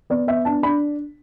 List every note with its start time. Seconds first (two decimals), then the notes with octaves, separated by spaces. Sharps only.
0.10 B3 D5
0.27 B3 E5
0.45 D4 A5
0.63 D4 B5